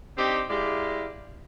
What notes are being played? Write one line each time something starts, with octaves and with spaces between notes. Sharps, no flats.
C4 D4 D#4 G4
G#3 E4 G4 D5 F5